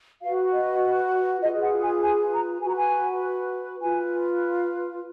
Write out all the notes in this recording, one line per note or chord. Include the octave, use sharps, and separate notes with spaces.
F#4 B4 F5
D#5
F4 G#4 B4 D#5
F#5
G#5
G#5
A#5
F#4 B4 G#5
A#5
G#5
F4 B4 G#5